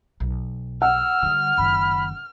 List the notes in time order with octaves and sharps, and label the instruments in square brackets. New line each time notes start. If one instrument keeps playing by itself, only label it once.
[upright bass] B1
[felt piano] F#5 [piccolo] E6 [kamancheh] F6
[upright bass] D3 G3
[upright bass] F#1 D#3 [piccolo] B5